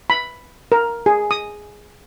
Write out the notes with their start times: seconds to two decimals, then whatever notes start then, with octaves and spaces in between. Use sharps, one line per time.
0.10 B5
0.72 A#4
1.06 G#4
1.31 D#6